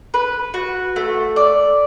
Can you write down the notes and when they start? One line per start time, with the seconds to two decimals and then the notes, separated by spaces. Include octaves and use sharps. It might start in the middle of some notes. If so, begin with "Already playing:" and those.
0.14 B4
0.54 F#4
0.96 A3
1.36 D5